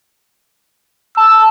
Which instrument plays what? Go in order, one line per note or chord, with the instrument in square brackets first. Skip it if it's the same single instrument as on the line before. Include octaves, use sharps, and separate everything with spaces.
[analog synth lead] A5 [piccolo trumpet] E6